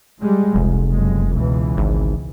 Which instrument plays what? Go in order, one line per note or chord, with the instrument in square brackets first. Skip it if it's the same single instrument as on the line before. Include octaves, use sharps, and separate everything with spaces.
[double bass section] G3 G#3
[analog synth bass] F1 [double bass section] C2
[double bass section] F#1 G#3
C#2 B2 E3
[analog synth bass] G#1